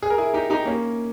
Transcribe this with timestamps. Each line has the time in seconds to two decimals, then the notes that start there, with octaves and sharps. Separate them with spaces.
0.02 G#4
0.10 A#4
0.18 E4 G#4
0.34 D#4 G4
0.50 D#4 G4
0.65 A#3 C#4